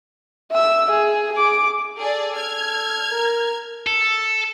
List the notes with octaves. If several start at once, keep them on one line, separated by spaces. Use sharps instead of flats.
E5 E6
G#4
G#4 D6
G#4 A4 D5
F6 G#6
A#4
A4